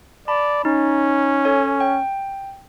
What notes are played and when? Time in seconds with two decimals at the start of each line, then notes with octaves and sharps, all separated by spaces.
0.28 D5 A5 B5
0.65 C#4 D#4
1.45 A4 C#5 G#5
1.80 G5